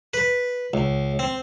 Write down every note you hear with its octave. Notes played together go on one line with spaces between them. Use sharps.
B4
C#2
C4